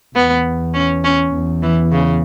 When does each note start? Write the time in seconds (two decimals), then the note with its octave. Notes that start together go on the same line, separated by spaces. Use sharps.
0.15 E2 B3
0.74 C#4
1.04 C#4
1.33 E2
1.62 E3
1.92 C#3